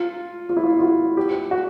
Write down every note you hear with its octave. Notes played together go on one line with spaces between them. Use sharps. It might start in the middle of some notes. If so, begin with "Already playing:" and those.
Already playing: F4
F4
E4
F4
F4
F#4
G4
F#4